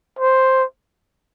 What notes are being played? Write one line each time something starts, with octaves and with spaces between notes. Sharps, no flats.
C5